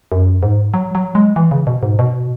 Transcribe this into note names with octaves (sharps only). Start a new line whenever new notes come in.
F#2
G#2
F#3
F#3
G#3
E3
C#3
B2
G#2
B2